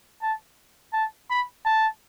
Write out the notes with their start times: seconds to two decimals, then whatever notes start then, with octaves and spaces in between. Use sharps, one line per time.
0.22 A5
0.93 A5
1.30 B5
1.65 A5